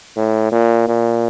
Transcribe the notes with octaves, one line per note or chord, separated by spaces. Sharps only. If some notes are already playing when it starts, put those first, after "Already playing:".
A2
A#2
A#2